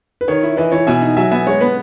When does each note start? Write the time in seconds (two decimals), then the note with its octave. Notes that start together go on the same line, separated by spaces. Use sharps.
0.21 B4
0.28 D#3 C#5
0.43 E4
0.57 E3 B4 D#5
0.72 E3 C#5
0.87 B2 E5 G#5
1.02 D#4
1.17 F#3 E5 G#5
1.31 B3 E5 G#5
1.46 G#3 C#5
1.61 B3 B4